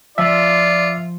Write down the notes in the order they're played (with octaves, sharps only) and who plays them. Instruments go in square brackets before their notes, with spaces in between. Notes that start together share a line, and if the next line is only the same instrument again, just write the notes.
[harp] F3 [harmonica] F4 [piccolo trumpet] D5 [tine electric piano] E5